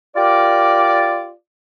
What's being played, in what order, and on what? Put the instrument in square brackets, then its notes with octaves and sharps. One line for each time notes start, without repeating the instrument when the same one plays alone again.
[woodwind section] F4 G4 A#4 D5